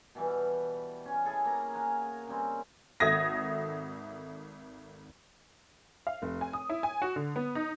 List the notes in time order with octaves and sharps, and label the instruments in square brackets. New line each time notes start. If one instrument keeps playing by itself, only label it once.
[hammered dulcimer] B2 E3 G3
C#4
E4 G#4 A4 D#5
A#3 A#5
F5 F#5 G#5 A#5
C#3 G3 C4
[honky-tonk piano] G#1 A4 E5 D#6 G#6 A#6
F5
F1
G#5
D#6
E4
G#5
F#4
D3
B3
D#4